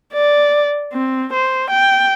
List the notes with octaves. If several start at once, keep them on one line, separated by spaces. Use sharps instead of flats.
D5
C4
C5
G5